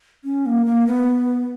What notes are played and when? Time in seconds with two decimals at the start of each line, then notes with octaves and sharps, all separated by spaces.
0.24 C#4
0.46 A#3
0.66 A#3
0.87 B3